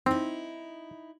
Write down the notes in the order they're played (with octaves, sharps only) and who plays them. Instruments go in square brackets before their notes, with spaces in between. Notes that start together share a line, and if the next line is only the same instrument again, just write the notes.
[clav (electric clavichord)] C4 [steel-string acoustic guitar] D#4 E4